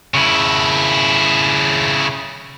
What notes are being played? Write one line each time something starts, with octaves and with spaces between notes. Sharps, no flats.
C#3 E4